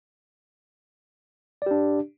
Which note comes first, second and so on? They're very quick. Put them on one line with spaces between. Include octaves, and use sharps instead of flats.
D5 G4 D4